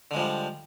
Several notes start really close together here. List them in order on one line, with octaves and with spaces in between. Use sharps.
D3 G#3 F3 G3